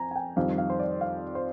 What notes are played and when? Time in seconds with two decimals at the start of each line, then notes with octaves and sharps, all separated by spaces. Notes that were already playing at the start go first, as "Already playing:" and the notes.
Already playing: F2 G#5 A#5
0.11 G#5
0.15 G5
0.36 F2 D#3 G3 F5
0.58 F5
0.70 C5
0.79 D5
1.01 F5
1.35 C5